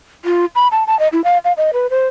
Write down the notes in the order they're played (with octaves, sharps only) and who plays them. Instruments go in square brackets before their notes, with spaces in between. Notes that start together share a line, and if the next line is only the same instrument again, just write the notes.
[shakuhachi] F4
B5
A5
A5
D#5
E4
F5
F5
D#5
B4
C5